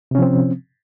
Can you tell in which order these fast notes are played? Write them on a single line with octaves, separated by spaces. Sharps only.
C3 C#4 F3 C4